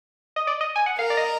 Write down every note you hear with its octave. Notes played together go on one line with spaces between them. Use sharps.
D#5
D5
D#5
G#5
F#5
A#4 F5
D5
D#5